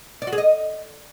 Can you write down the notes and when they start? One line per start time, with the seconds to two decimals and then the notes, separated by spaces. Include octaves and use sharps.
0.22 D5
0.27 F#4
0.33 G#4
0.38 D#5